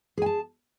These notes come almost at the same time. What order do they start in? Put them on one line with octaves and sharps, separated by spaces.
G#4 G#5 A5